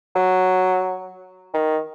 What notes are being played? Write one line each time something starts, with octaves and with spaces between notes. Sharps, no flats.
F#3
D#3